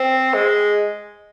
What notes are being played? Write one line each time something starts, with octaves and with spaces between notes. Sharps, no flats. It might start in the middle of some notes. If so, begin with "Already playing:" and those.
Already playing: C4
G#3